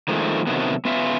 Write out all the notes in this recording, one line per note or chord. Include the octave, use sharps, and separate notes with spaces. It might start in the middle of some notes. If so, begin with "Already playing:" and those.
D#3 F3 G#3 A3
C3 D#3 F#3 A3 B3
B3 C#4 F4 E5